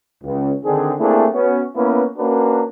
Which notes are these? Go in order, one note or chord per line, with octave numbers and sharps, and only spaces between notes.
C#2
D3 D#3 C4 D4 G#4
A3 A#3 C4 D4 E4 G#4
B3 C#4 F#4
A#3 B3 C#4 E4 B4
A#3 C#4 D4 F#4 A#4 B4